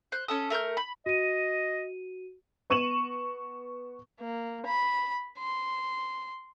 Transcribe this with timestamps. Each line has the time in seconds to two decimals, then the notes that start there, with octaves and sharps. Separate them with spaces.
0.12 C5 F#6
0.28 C#4 A4 D#6
0.50 A3 A#4 F6 G6
0.77 B5
1.06 F#4 D#5 D#7
2.70 B3 C#6 D#7 E7 F#7
4.20 A#3
4.66 B5
5.39 C6